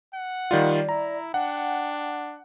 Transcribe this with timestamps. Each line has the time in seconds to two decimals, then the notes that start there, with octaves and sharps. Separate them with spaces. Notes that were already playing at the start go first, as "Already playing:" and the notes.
0.14 F#5
0.51 D#3 G3 F4 D5
0.89 E4 A#5
1.34 D4 F#5 G5